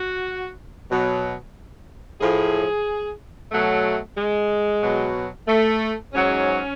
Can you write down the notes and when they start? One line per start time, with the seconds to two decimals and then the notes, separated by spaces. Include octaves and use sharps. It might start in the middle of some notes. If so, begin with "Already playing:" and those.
Already playing: F#4
0.90 B2 F#3
2.20 A2 F3 G#4
3.52 B2 F#3 A3
4.17 G#3
4.82 B2 F#3
5.48 A3
6.13 G#2 F#3 C#4